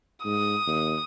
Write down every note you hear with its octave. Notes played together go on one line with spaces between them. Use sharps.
G#2 D#6
D#2